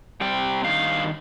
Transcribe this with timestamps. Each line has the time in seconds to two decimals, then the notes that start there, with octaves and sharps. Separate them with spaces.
0.21 C3 G3 G5
0.64 G2 D#3 F5